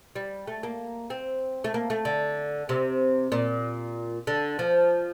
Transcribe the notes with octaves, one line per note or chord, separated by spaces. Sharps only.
G3
A3
A#3
C4
A3
A#3
A3
D3
C3
A#2
D3
F3